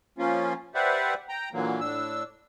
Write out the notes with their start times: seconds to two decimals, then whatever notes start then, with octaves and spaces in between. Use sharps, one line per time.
0.18 F3 A#3 C#4 F4
0.75 G4 B4 C5 D5 E5 F#5
1.29 G5 A#5
1.53 A#2 D3 E3 F#3 A#3
1.81 A2 D4 E6